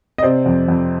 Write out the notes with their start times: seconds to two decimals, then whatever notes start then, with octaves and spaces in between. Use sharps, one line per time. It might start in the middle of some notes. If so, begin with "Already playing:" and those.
0.18 D#5
0.23 C3 C5 D5
0.46 F2
0.68 F2